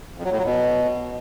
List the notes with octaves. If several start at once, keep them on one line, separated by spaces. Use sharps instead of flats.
F2
F#3
A2
F#3
B2